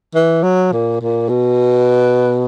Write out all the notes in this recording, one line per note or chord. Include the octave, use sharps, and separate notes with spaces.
E3
F#3
A#2
A#2
B2